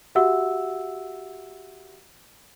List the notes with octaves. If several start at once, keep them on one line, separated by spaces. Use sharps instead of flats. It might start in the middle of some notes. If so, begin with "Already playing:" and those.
F#4 G4 E5 F#5 E6